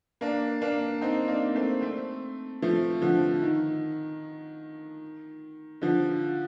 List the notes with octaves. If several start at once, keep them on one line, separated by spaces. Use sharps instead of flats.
A#3 D4
A#3 D4
C4 D#4
A#3 D4
A3 C4
A3 C4
F3 A3
D3 F3
D#3
D3 F3